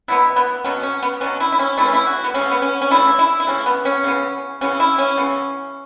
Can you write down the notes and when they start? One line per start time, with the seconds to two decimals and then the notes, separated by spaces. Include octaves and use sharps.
0.08 B2 F#3 B3 E4
0.36 B3
0.65 B2 F#3 B3 C#4
0.83 C#4
1.03 B3
1.21 B2 F#3 B3 C#4
1.40 E4
1.52 E4
1.59 C#4
1.77 A3 E4
1.80 C#3 E3 C#4
1.94 E4
2.06 F#4
2.24 B3
2.34 C#3 E3 A3 C#4
2.51 B3
2.62 C#4
2.81 C#4
2.91 C#3 E3 A3 E4
3.19 E4
3.40 E4
3.47 C#3 E3 A3 C#4
3.66 B3
3.85 C#4
4.04 C#3 E3 B3
4.61 C#3 E3 B3 C#4
4.80 E4
4.98 C#4
5.17 C#3 E3 B3